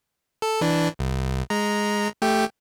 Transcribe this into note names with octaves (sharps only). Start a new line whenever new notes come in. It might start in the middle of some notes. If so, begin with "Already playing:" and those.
A4
E3 D4
C2
G#3 A#5
A3 G4 G5